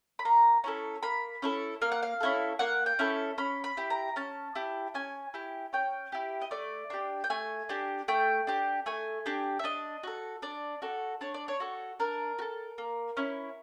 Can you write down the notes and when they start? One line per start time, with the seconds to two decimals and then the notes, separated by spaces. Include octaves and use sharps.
0.19 B5
0.25 A#3 A#5
0.64 C#4 E4 A4
1.03 A#3 B5
1.42 C#4 E4 A4
1.82 A#3 F5
1.92 F#5
2.02 F5
2.21 C#4 E4 A4
2.59 A#3 F#5
2.86 G5
2.99 C#4 E4 A4
3.38 C#4 B5
3.64 B5
3.77 E4 G4
3.90 A#5
4.16 C#4 A5
4.55 E4 G4
4.94 C#4 G#5
5.34 E4 G4
5.73 C#4 G5
6.12 E4 G4
6.41 D#5
6.51 A3 D5
6.90 D4 G4
7.24 G5
7.30 A3 G#5
7.69 D4 G4
8.08 A3 G5
8.47 D4 G4
8.86 A3 G#5
9.26 D4 G4
9.59 E5
9.64 D4 D#5
10.03 F#4 A4
10.42 D4 D5
10.82 F#4 A4
11.21 D4 C#5
11.34 D5
11.48 C#5
11.60 F#4 A4
12.00 D4 A#4
12.39 F#4
12.42 A4
12.78 A#3
13.17 C#4 E4